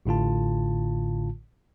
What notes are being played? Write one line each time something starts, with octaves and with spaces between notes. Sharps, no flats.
A1 A2 D3 F4 A5